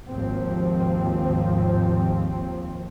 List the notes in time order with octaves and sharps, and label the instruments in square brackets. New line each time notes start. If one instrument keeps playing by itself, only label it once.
[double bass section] G#1 D#2 F3 C4